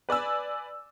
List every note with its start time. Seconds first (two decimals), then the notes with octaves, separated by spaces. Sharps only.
0.09 B4 D5 G#5 E6